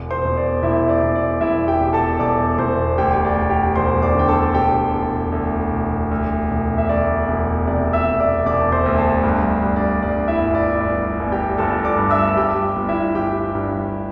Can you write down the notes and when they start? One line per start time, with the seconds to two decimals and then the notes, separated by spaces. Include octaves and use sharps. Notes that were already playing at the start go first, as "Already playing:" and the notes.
Already playing: E1
0.11 C5 C6
0.25 E1
0.37 D5
0.62 E1 E4 E5
0.89 D5
1.03 E1
1.15 D5
1.41 E1 E4 E5
1.68 G4 G5
1.80 E1
1.93 A4 A5
2.19 E1 D5 D6
2.58 E1 C5 C6
2.98 D2 G4 G5
3.25 D5
3.36 E1
3.49 G4 G5
3.76 E1 C5 C6
4.02 D5 D6
4.15 D3 G5
4.28 A4 A5
4.54 E1 G4 G5
4.94 E1
5.32 D2
5.71 E1
6.11 D2
6.50 E1
6.78 E5
6.89 D2 D5
7.28 E1
7.67 C3 D5
7.93 E5 E6
8.07 E1
8.20 D5 D6
8.46 E1 D5 D6
8.60 A5
8.72 C5 C6
8.86 D2
8.98 A4 A5
9.23 G2
9.63 G2
9.76 D5
10.02 G2 D5
10.28 E4 E5
10.42 G1
10.55 D5
10.80 G1 D5
11.19 G1
11.32 G4 G5
11.58 G1 A4 A5
11.84 D5 D6
11.98 G2
12.11 E5 E6
12.28 A5
12.37 G2 G4 G5
12.76 G1
12.89 E4 E5
13.15 G1 G4 G5
13.55 G2